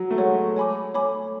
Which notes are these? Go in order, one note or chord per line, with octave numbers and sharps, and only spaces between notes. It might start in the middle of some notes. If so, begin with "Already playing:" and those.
Already playing: F#3
A3
G#3 C#5 F#5 C#6
C#5 G#5 B5 D6
A3 C#5 G#5 B5 D6